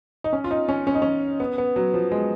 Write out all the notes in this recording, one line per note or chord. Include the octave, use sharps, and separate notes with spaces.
D#4
C#4
F4
D#4
C#4
C#4
D#4
C#4
B3
B3
F#3
F3
G#3